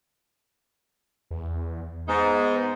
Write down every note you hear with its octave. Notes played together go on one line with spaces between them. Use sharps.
E2
G#2 B3 D#4